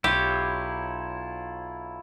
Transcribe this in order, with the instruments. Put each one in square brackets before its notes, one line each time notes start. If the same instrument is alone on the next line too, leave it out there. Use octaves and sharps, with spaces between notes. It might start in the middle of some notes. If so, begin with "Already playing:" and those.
[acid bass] B1 [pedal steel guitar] E4 F4 C#5 [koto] G4